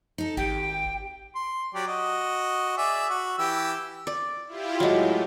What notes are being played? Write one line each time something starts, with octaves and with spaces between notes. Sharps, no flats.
D#4 A4
G#1 G4 G5
C6
F#3 G4 D5
F#4 D#5
G#4 D5 E5
F#4
E3 G4 E6
D5
E4 F4 G4
A2 F#3 G#3